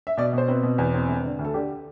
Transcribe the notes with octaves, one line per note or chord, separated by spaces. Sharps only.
E5
B2 D5
B2 C5
C4 B4
B2
E2
C4
E1
D3
D2
A4
D3 G4